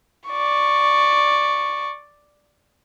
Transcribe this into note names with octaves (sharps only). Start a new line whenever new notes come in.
D5 C#6